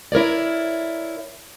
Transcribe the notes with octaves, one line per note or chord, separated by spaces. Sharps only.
E4 A#4 C#5 D5